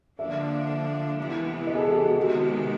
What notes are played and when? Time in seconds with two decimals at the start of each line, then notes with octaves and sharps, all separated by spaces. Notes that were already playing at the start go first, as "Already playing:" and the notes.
0.18 D3 F3 A#3 D4 E5
1.18 C3 E3 G#3 B3
1.67 D#5
1.75 G#4
1.80 A4
1.92 G4
2.04 F#4
2.17 C3 D#3 G#3 B3 F#4